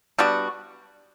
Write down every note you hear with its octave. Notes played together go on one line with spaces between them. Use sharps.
G3 B3 D4 F#4